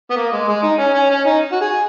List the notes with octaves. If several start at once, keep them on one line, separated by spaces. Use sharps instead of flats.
B3
A#3
G#3
G#3
D#4
C#4
C#4
C#4
D#4
F#4
G#4